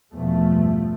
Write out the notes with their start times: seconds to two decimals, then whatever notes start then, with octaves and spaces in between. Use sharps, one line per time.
0.13 E2 B2 F3 A3
0.46 G2